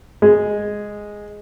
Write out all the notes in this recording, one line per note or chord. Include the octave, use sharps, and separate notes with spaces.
G#3